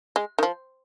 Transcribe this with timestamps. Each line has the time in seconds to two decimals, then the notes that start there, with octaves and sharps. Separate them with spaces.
0.16 G#3
0.39 D#3
0.43 F3